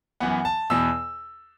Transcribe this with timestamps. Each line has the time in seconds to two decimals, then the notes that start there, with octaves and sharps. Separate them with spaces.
0.20 F#2 E3 B3 F#5
0.45 A5
0.70 E2 B2 B3 E6